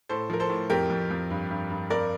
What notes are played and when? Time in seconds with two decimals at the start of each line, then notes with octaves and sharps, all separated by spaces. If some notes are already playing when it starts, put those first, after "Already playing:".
0.09 A2 A4 C5
0.30 F3 A#4
0.40 A4 C5
0.49 A2
0.70 F2 G4 A#4
0.90 F2
1.10 F2
1.30 G2
1.51 G2
1.70 G2
1.90 F2 A#4 D5